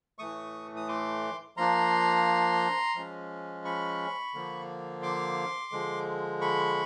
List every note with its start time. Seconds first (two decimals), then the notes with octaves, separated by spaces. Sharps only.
0.19 A2 E3 A3 C#6 D#6
0.76 D#6
0.88 C6 D6
1.57 F3 A#3 D4 A#5 C6
2.95 F3 G#3 C#4
3.65 B5 C#6
4.34 D3 F3 A#3
5.03 C6 D6
5.72 D3 F3 G#3
6.41 B5 C#6